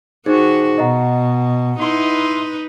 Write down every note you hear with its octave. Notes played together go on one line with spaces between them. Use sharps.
D#3 D#4 F#4 G#4 C5
B2 D#5 F#5 A#5
D#4 E4 B4 C6